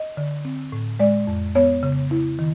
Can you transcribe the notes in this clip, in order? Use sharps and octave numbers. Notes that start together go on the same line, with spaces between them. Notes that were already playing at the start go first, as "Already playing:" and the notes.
Already playing: D#5
D3
C4
A2
G#3 D5
F2
B3 C#5
C#3
E4
D#3